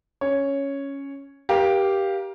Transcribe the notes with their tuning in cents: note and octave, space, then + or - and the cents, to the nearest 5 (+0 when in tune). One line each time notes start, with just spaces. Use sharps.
C#4 +0 C#5 +0
G4 +0 A#4 +35 F5 +0